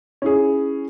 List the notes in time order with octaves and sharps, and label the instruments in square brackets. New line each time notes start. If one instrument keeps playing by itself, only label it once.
[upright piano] C#4 E4 G#4